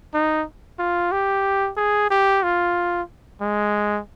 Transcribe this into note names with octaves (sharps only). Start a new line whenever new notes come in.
D#4
F4
G4
G#4
G4
F4
G#3